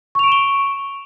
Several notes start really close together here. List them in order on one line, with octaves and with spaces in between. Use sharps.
C#6 F7 D7 E7 G7